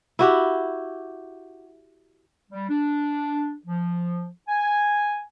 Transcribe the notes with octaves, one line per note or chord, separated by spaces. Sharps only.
E4 F#4 G4
G3
D4
F3
G#5